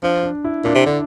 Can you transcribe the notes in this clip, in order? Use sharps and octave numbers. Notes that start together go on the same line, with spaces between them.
F3 D4
D4
E4
A#2 D4
C3
D3 D4